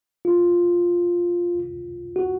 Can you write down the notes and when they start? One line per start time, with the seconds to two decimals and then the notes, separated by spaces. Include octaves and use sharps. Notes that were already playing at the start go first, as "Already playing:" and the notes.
0.25 F4
2.16 F#4